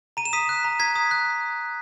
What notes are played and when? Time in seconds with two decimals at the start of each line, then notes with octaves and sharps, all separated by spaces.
0.17 A#5 D#7
0.25 E7
0.33 D#6 B6 D#7
0.49 F#6
0.65 A#5
0.80 A#5 G#6 B6
0.96 D#6
1.11 F#6